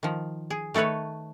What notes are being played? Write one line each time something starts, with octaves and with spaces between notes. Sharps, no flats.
D#3 F3
G#4
D#3 A3 A4 B4 C#5